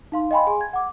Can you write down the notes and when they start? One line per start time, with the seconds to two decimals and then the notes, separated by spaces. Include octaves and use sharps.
0.12 D#4 F5 C6
0.31 D#5 F5 G5 G#5 B5 C6
0.47 G#4 G#5
0.61 G#6
0.73 F#5 D6